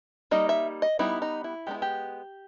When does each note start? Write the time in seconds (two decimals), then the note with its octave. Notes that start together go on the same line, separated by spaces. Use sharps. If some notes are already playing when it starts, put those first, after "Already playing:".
0.31 G3 A#3 D#4 D#5
0.49 E5
0.82 D#5
0.99 G3 B3 D#4 E4
1.22 D#4
1.44 E4
1.67 G#3 B3 D#4 G4
1.74 E4
1.82 G4